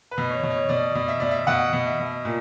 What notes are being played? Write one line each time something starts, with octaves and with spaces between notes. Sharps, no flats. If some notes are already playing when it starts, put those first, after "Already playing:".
B4
B2
C#5
B2
C#5
B2 D5
B2
E5
B2 D5
E5
B2 F#5
B2
E5
B2
A#2